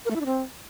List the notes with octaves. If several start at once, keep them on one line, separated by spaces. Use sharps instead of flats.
A#4
A3
E4
D4
C4